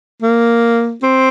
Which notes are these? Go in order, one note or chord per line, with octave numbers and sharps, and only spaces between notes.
A#3
C4